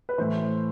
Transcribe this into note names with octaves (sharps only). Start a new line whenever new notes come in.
B4
A2 E3 C5